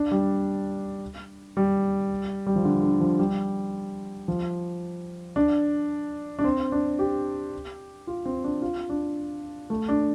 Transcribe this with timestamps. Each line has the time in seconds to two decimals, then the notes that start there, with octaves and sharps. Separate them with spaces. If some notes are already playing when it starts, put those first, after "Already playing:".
Already playing: D4
0.11 G3
1.57 G3
2.47 G3
2.56 F3
2.65 D3
2.83 D3
3.00 F3
3.19 G3
4.28 F3
5.36 D4
6.39 D4
6.44 C4
6.72 D4
6.99 G4
8.07 F4
8.26 C4
8.44 D4
8.62 F4
8.89 D4
9.70 A3
9.89 D4